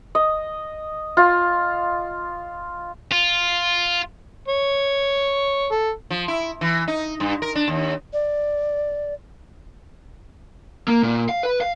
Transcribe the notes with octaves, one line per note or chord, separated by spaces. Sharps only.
D#5
F4
F4
C#5
A4
F3
E4
E3
D#4
G2
A#4
D4
D#2
D5
A#3
A#2
F5
B4
F5